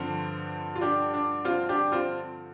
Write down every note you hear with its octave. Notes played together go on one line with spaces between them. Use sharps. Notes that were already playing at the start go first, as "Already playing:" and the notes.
Already playing: G2 D3 F3 C4
F4
D4 G4
D4
C4 F4
D4 G4
C4 F4